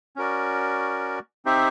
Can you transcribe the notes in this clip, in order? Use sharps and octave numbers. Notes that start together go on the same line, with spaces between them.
C#4 F#4 A#4 D5
C4 D#4 G4 C5 E5